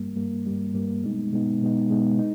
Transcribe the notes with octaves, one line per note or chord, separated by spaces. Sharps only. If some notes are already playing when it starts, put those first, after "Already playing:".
Already playing: G2 G3 A#3
G2 G3 A#3
G2 G3 A#3
G2 G3 A#3
B2 G#3 B3 D#4
B2 G#3 B3 D#4
B2 G#3 B3 D#4
B2 G#3 B3 D#4
D#4